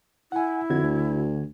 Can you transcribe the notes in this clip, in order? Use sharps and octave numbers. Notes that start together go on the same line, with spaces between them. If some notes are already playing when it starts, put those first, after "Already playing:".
E4 F#5 G#5
F2 D3 F#4 G#6
D2